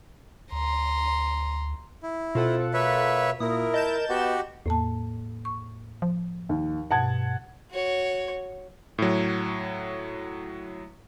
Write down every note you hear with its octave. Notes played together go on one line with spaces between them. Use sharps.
D2 A#5 C6
E4
B2 C4 F4 A4 F#5
A#3 B4 C#5 E5
A#2 E4 A#4 D#6
D#5 A5 G6 E7
B3 F#4 G4
E2 A2 A#3 A5
C#6
F3
D#2
G2 B2 F#5 A5 G#6
F#4 C#5
A2 F#3